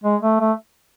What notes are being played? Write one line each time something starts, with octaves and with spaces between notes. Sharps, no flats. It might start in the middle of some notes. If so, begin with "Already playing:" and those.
G#3
A3
A3